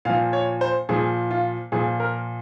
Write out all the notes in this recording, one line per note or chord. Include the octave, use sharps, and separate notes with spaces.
A#2 F3 F5
C#5
C5
A#2 F3 G#4
F4
A#2 F3 G#4
A#4